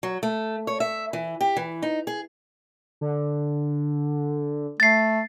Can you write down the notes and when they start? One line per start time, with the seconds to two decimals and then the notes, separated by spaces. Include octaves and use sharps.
0.03 F#3
0.23 A3
0.67 C#5
0.80 E5
1.13 E3
1.41 G4
1.56 E3
1.82 D#4
2.07 G#4
3.01 D3
4.80 A3 A6 C7